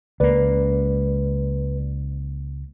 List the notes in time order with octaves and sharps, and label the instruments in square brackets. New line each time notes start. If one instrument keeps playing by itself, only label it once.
[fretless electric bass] C#2 A#3 [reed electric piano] B4 D5